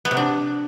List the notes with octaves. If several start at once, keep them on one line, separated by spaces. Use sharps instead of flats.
B3
C3
D4